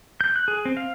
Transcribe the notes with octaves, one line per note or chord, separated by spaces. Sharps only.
G6
F#6
G#4
C4
F5